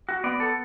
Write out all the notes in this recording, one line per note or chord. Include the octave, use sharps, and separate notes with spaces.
F#4
B3 D5
A4